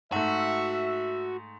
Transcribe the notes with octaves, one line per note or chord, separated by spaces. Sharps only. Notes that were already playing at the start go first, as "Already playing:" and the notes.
G#2 A3 F#4 E5